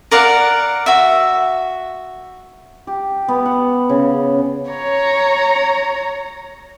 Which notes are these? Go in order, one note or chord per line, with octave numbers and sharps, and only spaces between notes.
A#4 D5 F5 F#5
F#4 E5
G4
B3
F#5
C#3
C#5 A#5